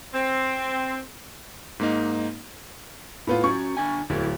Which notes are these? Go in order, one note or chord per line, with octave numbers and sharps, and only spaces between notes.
C4
G#2 A#3 D#4
A2 B3 F4
C#4 F#4 C#6
D3 D4 G#5
D1 F#3 E4 A#4